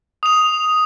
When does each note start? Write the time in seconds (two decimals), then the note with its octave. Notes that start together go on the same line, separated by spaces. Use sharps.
0.23 D#6 F7